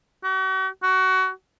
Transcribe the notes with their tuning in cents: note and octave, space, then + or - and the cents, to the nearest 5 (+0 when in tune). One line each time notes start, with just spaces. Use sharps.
F#4 +40
F#4 +25